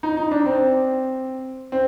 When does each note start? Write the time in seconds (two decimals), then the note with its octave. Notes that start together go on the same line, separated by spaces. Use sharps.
0.03 D#4
0.17 D#4
0.31 D4
0.46 C4
1.72 C4